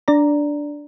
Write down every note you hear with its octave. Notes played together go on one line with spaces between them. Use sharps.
D4 D5 A#5